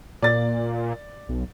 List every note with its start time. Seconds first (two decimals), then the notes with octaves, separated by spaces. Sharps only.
0.22 A#2 D5 A6
1.29 B1